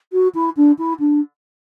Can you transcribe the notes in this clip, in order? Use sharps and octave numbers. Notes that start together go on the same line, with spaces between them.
F#4
E4
D4
E4
D4